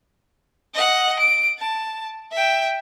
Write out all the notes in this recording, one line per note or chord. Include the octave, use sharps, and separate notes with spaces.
D#5 F#5
D7
A5
E5 G5